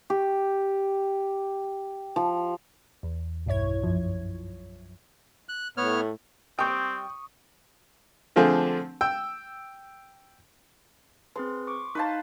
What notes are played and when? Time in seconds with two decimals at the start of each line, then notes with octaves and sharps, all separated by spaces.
0.10 G4
2.16 F3
3.03 E2
3.46 B1 G2 E4 C#5 G#6
3.83 F#2 F3
5.49 F#6
5.77 A2 B3 C#5 F6
6.59 G3 C4 G4 G5 C#6 D#6
8.36 D3 F3 A3 C4 G#4
9.01 G5 E6
11.36 C4 G#4 B4 C6
11.67 C#6 D6
11.95 D#4 B4 C5 F5 A5